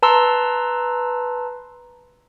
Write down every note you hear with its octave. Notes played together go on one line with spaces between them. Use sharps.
B4 A5 A#5 C6 E6